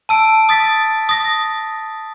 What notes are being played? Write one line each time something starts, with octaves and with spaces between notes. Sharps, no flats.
A5 E6 D7
D#6 A6 B6
D#6 A#6